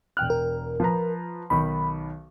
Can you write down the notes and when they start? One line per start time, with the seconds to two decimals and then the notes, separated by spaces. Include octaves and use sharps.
0.17 E1 G5 F6 F#6
0.30 A#4
0.80 F3 B4 A#5
1.50 B1 D#3 B5